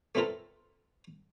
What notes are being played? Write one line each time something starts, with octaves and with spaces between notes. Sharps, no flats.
A3 B3 C4 F4 A4 A#4